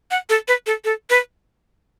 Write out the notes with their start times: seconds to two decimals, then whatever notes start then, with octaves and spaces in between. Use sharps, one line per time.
0.11 F#5
0.30 A4
0.48 B4
0.67 A4
0.85 A4
1.10 B4